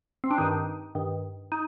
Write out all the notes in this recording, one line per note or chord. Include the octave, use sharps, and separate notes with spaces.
C4
D4
G2 D#3 D#4
G2 D#3
D#4